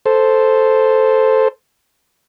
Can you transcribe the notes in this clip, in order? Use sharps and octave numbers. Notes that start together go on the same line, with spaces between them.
A4 C5